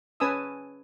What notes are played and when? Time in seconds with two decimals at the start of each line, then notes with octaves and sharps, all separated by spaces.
0.20 C#4 B4 G#5 A5 D#6 E6